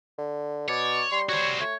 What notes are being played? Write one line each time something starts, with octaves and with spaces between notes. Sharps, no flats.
D3
B2 C#5 D5
G3 C6
F#4 C5 C#5
A3 C#5